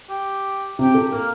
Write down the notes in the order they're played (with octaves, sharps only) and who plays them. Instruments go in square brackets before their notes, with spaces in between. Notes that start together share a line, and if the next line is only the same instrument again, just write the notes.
[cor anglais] G4
[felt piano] C3 [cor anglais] G4
[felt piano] A4
[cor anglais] A#3 [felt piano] A#4